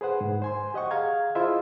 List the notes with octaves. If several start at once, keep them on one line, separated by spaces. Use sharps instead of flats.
G#4 B4 C5 F#5
G#2
C5 G#5 C6
G4 D#5 F#5 C#6
G#4 F5 A#5 G#6
E4 F4 G#4 C5 D#5 E5